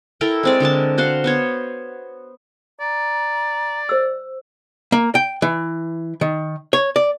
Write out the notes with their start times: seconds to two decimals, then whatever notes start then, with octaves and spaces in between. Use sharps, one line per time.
0.21 E4 A4 A#4 G5
0.43 G#3 C4 D5
0.60 D3 G#3 A#4 A5
0.98 F#4 C5 F5 F#5
1.24 B3 C5 C#5
2.80 D5 A#5
3.89 C5 E6
4.92 A#3
5.15 G5
5.42 E3
6.21 D#3
6.73 C#5
6.96 D5